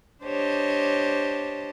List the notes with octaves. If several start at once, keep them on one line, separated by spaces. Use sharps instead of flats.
D4 G4 C5 C#5 D#5 A5